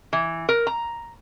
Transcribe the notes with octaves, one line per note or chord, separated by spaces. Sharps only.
E3
A#4
A#5